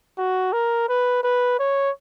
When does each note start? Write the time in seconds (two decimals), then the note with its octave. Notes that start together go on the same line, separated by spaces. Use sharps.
0.18 F#4
0.53 A#4
0.89 B4
1.23 B4
1.59 C#5